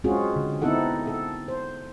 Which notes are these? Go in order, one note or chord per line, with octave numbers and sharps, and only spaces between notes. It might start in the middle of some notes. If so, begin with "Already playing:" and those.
G#3 C4 C#4 F4 F#4 G#4
D3
B3 C4 D#4 E4 A4 F#5
A4
C5